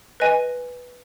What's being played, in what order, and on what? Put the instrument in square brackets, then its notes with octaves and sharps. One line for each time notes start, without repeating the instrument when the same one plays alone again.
[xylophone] B4 D#5 G#5